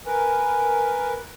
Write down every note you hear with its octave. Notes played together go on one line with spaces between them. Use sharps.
A#4 B4 G#5